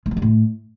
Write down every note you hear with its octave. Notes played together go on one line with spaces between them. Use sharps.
G#3
F3
G3
A2